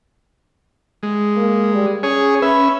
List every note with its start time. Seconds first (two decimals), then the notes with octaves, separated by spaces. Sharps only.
1.03 G#3
1.37 A#3
1.74 G3
2.03 C#4 G#4 C#5
2.42 C#4 B4 E5